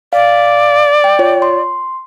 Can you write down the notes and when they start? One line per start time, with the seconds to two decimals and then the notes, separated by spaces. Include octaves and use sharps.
0.13 D5 F5
1.04 G5
1.19 F4 C#5
1.42 C6